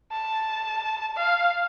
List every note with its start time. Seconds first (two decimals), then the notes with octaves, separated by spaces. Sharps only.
0.12 A5
1.17 F5